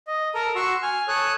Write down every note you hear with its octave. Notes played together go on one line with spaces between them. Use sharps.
D#5
A4 A#4 A#5
F#4 C6 C#6 E6
G#5 F6
A4 C#5 D#6 F#6